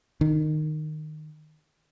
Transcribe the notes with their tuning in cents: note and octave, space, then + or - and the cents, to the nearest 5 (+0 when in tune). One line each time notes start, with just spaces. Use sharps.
D#3 -20